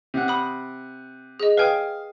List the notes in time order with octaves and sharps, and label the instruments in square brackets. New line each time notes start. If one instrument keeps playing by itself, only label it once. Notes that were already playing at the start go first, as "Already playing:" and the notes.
[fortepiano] C3 F#5
[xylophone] B5 D#6
G#4 D#5
[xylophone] B4 G5 [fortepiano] F5 G#5 D#6